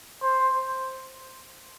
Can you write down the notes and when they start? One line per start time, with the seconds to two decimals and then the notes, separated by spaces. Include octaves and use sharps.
0.22 C5